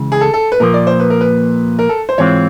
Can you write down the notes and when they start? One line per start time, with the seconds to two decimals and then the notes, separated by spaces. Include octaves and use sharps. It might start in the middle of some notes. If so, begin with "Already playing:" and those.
Already playing: C#2 C#3 E3 G#3
0.12 G#4
0.21 A4
0.34 A4
0.52 B4
0.60 A#2 F3 A#3 A#4
0.74 D5
0.87 C5
1.00 B4
1.10 A#4
1.21 B4
1.79 A#4
1.89 A4
2.09 C5
2.18 G#2 E3 G#3 C4 F4 C#5